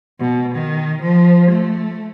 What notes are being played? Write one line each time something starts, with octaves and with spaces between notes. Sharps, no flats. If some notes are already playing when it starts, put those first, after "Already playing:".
B2
D#3
F3
A3